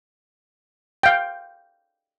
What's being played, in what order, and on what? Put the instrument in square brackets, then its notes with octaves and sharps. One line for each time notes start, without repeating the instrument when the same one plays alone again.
[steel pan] F5 G5